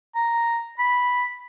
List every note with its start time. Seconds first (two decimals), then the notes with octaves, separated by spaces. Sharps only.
0.15 A#5
0.79 B5